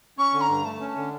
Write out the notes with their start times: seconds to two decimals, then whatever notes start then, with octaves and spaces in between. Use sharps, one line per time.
0.18 C#4 C#6
0.33 D3
0.41 A#5
0.49 G2
0.64 A3 A5
0.80 C#4
0.88 A5
0.97 D3